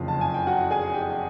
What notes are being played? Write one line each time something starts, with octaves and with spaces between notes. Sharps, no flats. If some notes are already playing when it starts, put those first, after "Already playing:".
Already playing: F#1 F2 C#3 F4
A5
G#5
G5
F#4 F#5
G#4 G#5
G4 G5